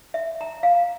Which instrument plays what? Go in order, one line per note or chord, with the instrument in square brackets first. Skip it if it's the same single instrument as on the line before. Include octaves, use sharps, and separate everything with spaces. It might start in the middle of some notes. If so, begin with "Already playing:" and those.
[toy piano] E5
A#5
F5